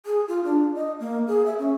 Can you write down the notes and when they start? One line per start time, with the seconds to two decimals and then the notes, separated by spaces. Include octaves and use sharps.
0.06 G#4
0.28 F4
0.44 D4
0.75 D#5
1.00 A#3
1.27 G#4
1.46 E5
1.59 C#4